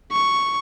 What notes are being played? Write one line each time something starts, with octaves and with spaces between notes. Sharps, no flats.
C#6